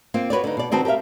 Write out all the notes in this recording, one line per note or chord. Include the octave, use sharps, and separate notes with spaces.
A#3 C4 F4
F#4 B4 C#5 D5
D3 D#4
B2 D5
D#3 C4 F#4 B4 A5
G4 A#4 B4 E5 F5